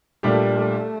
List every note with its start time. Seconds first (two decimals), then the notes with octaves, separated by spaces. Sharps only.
0.23 A#2 G3 A3 D4 G4
0.55 A3